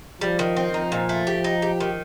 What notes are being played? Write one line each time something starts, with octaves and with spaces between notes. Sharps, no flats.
F3 G3
D#3
C4
F3 D#4
A#2
A3
G4
D#4
G4
D#3